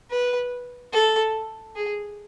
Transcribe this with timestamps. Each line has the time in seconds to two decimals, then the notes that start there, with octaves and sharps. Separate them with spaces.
0.11 B4
0.93 A4
1.76 G#4